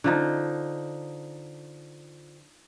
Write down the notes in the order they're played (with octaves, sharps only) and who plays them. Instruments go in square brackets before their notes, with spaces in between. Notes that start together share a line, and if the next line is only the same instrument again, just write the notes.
[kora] D3 F3 D#4